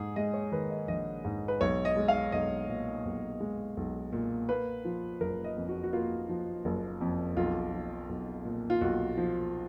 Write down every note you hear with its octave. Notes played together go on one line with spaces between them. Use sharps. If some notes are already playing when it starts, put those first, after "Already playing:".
Already playing: G#2 G#4
G#3 D#5
C#5
D#3 B4
D#5
A#1 D#5
G#2
B4
B1 C#5
D#5
G#3
F5
B1 D#5
A#2
B1
G#3
B1
A#2
A#3 B4
F3
F#1 A#4
D#5
F2
F#4
F#4
A#3 F4
F3
F#1
F2
B1 F4
F3
B1
A#2
F4
B1 F#4
F3